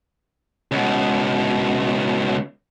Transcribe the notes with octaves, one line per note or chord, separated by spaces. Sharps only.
C#2 B2